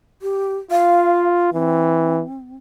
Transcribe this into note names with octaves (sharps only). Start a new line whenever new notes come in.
G4
F4 F5
E3 C4